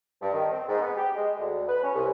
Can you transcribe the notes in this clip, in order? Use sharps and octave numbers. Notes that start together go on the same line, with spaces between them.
G2
D#3
C4
G#2
B3
G4
G#3
D2
B4
C#4
C2